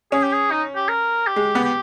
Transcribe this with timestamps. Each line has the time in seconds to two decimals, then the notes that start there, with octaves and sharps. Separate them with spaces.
0.12 C#4 G#4
0.23 G4
0.33 G#4
0.51 D#4
0.76 G4
0.89 A#4
1.27 G4
1.36 G#3
1.55 B3
1.65 G4